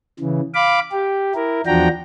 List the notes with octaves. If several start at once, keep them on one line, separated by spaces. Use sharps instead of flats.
C#3 E3
F5 B5 D6
G4
E4 A#4
E2 F3 D4 F#4 G5 A#5